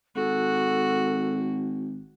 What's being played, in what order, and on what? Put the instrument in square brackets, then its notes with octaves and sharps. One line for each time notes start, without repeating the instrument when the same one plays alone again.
[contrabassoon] G#1 [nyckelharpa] F#4 [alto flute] A4